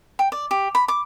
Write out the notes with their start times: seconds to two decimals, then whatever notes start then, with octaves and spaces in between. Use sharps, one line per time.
0.19 G5
0.32 D5
0.51 G4
0.75 B5
0.88 D6